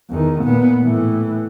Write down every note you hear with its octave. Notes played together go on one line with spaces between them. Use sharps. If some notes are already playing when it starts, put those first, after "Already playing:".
E2 D#3
A#2 B3
A2 E3